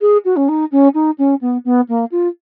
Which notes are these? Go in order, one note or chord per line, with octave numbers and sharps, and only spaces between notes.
G#4
F#4
C#4
D#4
C#4
D#4
C#4
B3
B3
A#3
F4